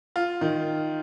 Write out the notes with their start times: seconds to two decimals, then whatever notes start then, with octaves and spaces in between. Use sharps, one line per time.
0.16 F4
0.41 D#3